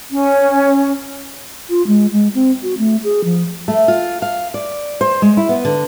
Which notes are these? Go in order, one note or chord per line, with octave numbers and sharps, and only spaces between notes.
C#4
F4
G#3
G#3
C4
F#4
A3
G#4
F3
A3
F4
F5
D5
C5
G#3
E4
B3
D3